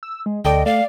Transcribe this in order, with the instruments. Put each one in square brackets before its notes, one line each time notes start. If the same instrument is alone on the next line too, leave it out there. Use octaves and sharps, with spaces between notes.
[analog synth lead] E6
G#3
[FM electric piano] D2 A4 D5 [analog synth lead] D#5 [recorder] G5
[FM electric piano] A3 [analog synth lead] D5 [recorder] F5